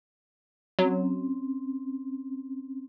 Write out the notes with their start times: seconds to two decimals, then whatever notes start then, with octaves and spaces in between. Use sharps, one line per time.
0.79 F#3 C4 C#4